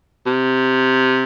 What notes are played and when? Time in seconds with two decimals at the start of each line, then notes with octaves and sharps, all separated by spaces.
0.27 C3